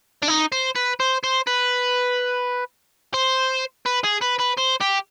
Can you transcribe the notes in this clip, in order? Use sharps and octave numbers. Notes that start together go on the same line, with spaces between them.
D4
D#4
C5
B4
C5
C5
B4
C5
B4
G#4
B4
B4
C5
G4